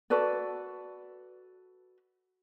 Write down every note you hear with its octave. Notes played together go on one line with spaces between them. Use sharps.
F#4 A4 B4 D5